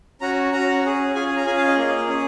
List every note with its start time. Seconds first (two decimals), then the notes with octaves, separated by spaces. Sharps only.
0.21 C#4 F#4 A#5
0.52 C#4 F#4 A#5
0.84 C#4 G#4
1.15 C#4 F4 G#4 G#5
1.36 A#5
1.46 C#4 F4 G#4 G#5
1.57 F5
1.67 D#5
1.78 A#3 F4 G#4
2.08 C#4 G#4